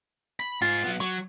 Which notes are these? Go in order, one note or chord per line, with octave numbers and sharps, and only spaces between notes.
B5
G#2 F4 G#4
F#3 B3
F#3 C#6